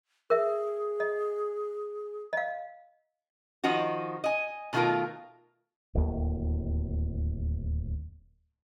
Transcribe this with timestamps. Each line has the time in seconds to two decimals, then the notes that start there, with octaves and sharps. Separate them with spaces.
0.30 G#4 A#4 E5
1.00 D#5
2.33 D#5 F5
3.64 D#3 F3 D#4 F#4
4.24 D#5 G#5
4.73 B2 D#3 A3 D#4 F4 A#4
5.95 D1 D#2